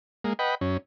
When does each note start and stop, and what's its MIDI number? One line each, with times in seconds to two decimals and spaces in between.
0.24 0.33 56
0.24 0.33 58
0.39 0.55 71
0.39 0.55 75
0.39 0.55 78
0.39 0.55 79
0.39 0.55 83
0.61 0.77 42
0.61 0.77 61